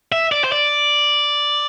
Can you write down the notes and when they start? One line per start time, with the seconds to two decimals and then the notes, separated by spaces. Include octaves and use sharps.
0.12 E5
0.32 D5
0.44 C5
0.52 D5